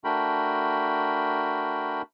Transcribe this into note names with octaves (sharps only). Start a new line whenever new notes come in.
A3 D4 F#4 A#4 G5 B5